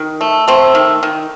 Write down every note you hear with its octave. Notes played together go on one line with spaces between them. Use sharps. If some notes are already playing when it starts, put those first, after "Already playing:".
Already playing: D#3
A3
A3 C4
D#3
D#3